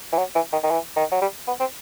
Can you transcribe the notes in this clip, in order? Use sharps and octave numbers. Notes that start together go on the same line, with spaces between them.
E3
F#3
E3
D#3
D#3
E3
D#3
F#3
G3
B3
C4